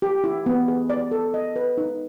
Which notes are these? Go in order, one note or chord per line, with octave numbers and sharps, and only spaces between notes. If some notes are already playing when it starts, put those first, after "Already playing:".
G4
E4
B3
G#4
D5
A4
D#5
B4
D#4